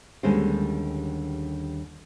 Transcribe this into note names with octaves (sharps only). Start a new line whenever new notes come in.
D#2 D3 G3 G#3 C#4 C5